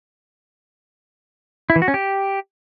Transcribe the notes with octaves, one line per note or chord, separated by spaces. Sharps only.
E4
E3
F#4
C#4
G4